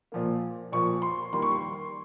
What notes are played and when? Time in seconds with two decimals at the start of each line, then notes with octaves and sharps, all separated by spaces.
0.12 A#2 F3 A#3
0.72 A#2 F3 A#3 C#6
1.02 C6
1.33 D#3 G3 A#3 C6
1.42 C#6
1.51 C6